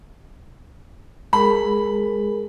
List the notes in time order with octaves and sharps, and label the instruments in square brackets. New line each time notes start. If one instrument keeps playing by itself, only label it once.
[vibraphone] G#3 G#4 A#4 [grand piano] B5